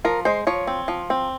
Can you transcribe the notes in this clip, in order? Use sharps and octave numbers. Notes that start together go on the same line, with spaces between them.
F3 A#4
G#3 C5
F3 C#5
C4
F3
C4